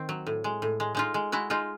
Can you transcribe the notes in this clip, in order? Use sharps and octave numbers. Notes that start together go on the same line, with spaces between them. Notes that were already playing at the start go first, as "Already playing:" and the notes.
Already playing: D#3 C4
F#3
A2
G#3
A2
G#3
G#3 D#4 F4
G#3
G#3 E4 F#4
G#3 D#4 F4